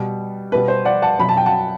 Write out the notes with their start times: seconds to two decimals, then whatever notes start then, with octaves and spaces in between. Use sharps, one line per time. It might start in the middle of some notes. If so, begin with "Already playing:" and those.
Already playing: B2 G3
0.52 B2 G3 B4
0.68 C5
0.85 D5 F#5
1.02 F#5 A5
1.19 B2 F#3 B5
1.29 A5
1.37 G5
1.46 F#5 A5